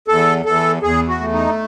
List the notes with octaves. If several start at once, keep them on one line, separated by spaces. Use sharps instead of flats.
E2 A4
E2 A4
E2 G#4
F#4
A3
D#4